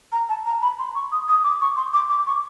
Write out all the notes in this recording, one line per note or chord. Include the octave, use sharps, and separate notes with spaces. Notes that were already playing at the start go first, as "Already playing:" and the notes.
A#5
A5
A#5
B5
C6
C#6
D#6
D#6
D6
C#6
C6
D6
D6
C#6